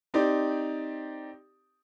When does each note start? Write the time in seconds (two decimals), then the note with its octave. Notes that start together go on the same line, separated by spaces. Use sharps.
0.14 C4 D#4 G4 D5